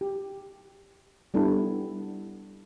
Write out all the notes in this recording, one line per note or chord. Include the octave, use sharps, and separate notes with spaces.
G4
G3 B3 D4 E4 A4